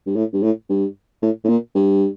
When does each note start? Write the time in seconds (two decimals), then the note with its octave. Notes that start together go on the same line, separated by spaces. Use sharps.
0.06 G2
0.16 A2
0.33 G2
0.43 A2
0.69 G2
1.22 A2
1.44 A2
1.49 A#2
1.75 G2